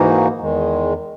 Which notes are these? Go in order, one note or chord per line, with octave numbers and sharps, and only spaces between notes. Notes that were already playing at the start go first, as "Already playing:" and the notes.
Already playing: G#2 E3 A#3 D#4 F#4
E2 D#3 G#3